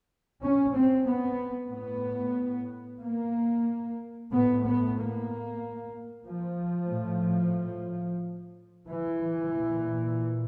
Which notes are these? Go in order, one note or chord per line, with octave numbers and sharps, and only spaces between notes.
C#4
C4
B3
A2 B3
A#3
A2 B3
B3
A#3
F3
A2
E3
A#2